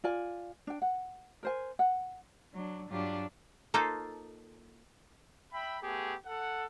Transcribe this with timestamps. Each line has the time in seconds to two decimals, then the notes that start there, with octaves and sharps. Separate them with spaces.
0.04 F4 D5 G#5
0.67 D4 G5
0.82 F#5
1.43 A#4 C5 G#5
1.79 F#5
2.53 F#3 D4
2.88 G2 F#3 D4 F4 G4
3.74 A#3 D#4 F4 A4 C5
5.53 E5 G5 B5
5.82 A3 B3 G4 G#4
6.26 A4 F#5